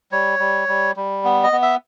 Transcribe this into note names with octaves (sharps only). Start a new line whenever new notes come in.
G3 C#5
G3
G3
G3
B3
D#5
B3
E5